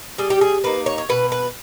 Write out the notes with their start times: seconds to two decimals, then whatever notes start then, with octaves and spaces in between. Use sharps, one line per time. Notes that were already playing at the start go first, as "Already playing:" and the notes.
0.18 G3 G#4
0.30 G4
0.41 G#4
0.64 A#3 D#4 B4
0.86 C#5
0.98 C#5
1.09 B2 B4
1.32 B4